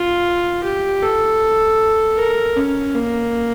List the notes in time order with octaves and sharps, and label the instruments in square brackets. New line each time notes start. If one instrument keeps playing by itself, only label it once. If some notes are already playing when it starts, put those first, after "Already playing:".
Already playing: [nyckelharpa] F4
G4
A4
A#4
C#4
A#3